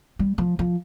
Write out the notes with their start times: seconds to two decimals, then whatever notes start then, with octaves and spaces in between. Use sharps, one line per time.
0.19 G3
0.38 F3
0.59 F3